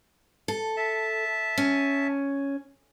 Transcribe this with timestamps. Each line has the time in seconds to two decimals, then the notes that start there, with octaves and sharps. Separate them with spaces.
0.48 A4
0.77 E5 A5
1.58 C#4